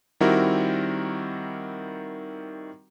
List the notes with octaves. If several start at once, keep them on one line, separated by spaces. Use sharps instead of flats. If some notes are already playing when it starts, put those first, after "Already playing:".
D#3 G3 C4 E4 F#4 A#4